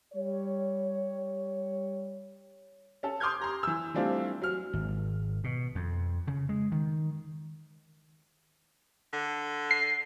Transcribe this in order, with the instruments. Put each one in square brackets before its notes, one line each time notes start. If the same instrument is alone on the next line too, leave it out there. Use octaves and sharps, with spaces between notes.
[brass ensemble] G3 C#5
[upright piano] C#4 A4
C6 D6 D#6 F6 G6 G#6
G4 A#5 C6
E3 E6
E3 G3 A3 C4 D4 F4
F#3 F6
[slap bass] G#1
B2
F2
C#3
G#3
D#3
[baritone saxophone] D3
[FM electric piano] C7